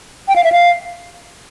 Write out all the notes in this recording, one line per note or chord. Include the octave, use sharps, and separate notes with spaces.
G5
F5
E5
F5